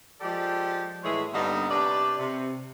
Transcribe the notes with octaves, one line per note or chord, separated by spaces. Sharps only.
F3 G#3 G4 A4 D5
A2 E3 G#3 G#4 C#5 E5
G2 D3 G3 A#3 B3 D#4
C3 D4 B4 C#5 D5
C3